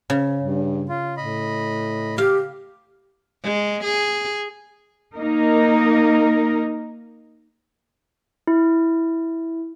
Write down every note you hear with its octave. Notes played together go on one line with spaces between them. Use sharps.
C#3
G2
F4
A2 D#5 B5
G4 F5
G#3
G#4
A#3 D#4 A#4
E4